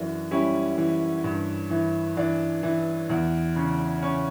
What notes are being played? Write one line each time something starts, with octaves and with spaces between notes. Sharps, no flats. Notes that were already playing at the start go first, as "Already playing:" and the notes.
Already playing: F#2 E3 D4 F#4
G3 C#4 E4
E3
G2
E3
E3 D4
E3
E2
C#3
C#3 C#4